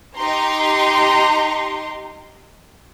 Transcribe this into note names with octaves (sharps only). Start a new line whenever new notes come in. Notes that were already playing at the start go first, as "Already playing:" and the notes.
D#4 G4 A#5 C6